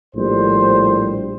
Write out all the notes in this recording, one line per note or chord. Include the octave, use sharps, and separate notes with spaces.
A#1 A2 G3 C5